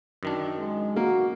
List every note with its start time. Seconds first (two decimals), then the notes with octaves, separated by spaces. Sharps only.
0.23 F#2 D#3 D4
0.59 G#3
0.96 A#3 F#4